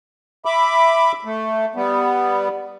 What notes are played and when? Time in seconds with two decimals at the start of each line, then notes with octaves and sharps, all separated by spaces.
0.45 E5 B5 D6
1.25 A3
1.75 G3 B3